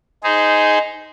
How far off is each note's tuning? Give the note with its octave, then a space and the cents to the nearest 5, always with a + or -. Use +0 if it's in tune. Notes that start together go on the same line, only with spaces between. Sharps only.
D#4 +0 G#4 +0 C5 -20